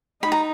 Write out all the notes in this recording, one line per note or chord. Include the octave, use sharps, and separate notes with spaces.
D#4 B5
A#5